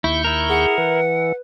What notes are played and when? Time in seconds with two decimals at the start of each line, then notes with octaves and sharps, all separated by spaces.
0.04 D#2 E4 C#6 G6
0.24 E4 A#4
0.49 G#4 F#5
0.78 E3 B4